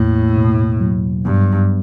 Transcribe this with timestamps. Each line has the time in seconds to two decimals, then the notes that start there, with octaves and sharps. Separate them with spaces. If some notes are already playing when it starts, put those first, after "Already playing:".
Already playing: E2 A2 A#3
0.36 B2
0.80 F#3
1.24 G2 B3